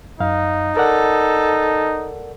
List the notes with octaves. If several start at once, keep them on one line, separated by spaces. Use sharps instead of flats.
F#2 D#4 F5
A4 A#4 D5 F#5